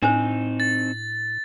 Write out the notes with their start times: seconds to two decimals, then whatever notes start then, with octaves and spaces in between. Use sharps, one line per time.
0.03 A2 C4 D4 D#4 C5
0.60 A6